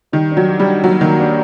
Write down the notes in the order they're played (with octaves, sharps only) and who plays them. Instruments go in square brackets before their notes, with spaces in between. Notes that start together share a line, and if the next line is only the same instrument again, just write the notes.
[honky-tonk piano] D#3 [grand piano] G3
[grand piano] D4
[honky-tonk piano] F#3
[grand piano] G4
[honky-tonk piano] G3
[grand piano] D4
[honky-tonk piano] F#3 [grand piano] A#3
[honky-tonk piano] D#3 [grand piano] A#3
[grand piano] D4